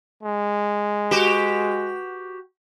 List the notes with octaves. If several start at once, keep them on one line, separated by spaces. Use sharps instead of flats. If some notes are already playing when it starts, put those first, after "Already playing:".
G#3
F#4 G4 B4